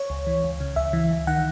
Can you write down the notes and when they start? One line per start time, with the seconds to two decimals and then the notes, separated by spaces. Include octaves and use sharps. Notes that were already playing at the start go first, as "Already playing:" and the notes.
Already playing: C#5
0.10 C#2
0.27 E3
0.44 C#2
0.60 C#3
0.76 C#2 E5
0.93 E3
1.10 C#2
1.27 D#3 F#5